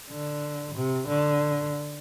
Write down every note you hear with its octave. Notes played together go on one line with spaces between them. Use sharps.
D3
C3
D3